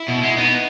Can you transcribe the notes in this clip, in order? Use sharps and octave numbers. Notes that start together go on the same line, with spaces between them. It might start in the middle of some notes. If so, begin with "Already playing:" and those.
Already playing: E4
B2
G#3
B3 D#4